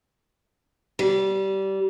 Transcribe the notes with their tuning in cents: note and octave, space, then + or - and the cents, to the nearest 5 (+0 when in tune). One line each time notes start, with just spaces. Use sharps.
G3 -20